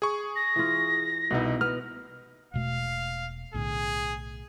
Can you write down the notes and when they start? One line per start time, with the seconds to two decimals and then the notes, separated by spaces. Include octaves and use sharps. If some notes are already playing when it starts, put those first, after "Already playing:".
0.02 G#4 C#6
0.35 A#6
0.56 E3 F4
1.30 C2 B2 B3 D#4 E4
1.61 B3 F6
2.54 E1 B2 A3 F5
3.54 B1 A2 D3 G#4